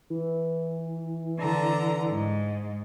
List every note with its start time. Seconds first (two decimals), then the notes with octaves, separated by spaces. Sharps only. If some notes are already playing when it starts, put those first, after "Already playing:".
0.10 E3
1.39 D3 A#5
2.10 G#2